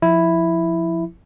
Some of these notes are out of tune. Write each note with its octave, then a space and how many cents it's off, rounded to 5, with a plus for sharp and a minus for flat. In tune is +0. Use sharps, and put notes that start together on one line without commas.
F3 +0 E4 +0